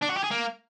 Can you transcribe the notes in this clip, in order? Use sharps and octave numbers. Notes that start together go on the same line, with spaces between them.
D4
F#4
G4
G#4
A#3